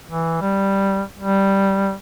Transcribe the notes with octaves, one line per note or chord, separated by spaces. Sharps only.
E3
G3
G3